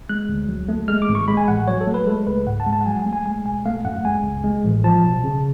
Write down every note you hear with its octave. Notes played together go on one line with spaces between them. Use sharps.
G#3 F#6
D2
F#3
A3
G#3 F6
D6
G#1
C#6
G#3 B5
G#5
A1 F#5
F#3 C#5
A4
A3
B4
G#3 A4
C#2 B4
G#2 F#5
A5
G#3
A5
F#5
F#3 G#5
G#5
A3
G#5
G#3 G#5
B1 G#5
A3 F5
F#2 F#5
G#3 G#5
C#2
G#3
A1
F3 A5
B1
C#3